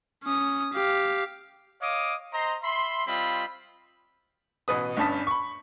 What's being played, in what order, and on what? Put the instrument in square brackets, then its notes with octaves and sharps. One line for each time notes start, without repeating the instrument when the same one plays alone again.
[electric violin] C#4 D#6
G4 F5
[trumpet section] C#5 D#5 F5 D6 D#6
C5 D#5 A#5 C6
E5 B5 C6
G3 C4 F4 D#5 B5
[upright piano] A1 B2 B4 D#6
G1 G2 C#4 A5 D#6 B6
B5 C#6